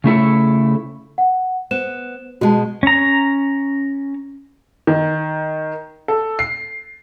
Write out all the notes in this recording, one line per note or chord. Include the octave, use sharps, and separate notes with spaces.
C#3 A3 E4 A4
F#5
B3 C5 E7
B2 G#3 F#4 A5
C#4 A#5
D#3
A4
C7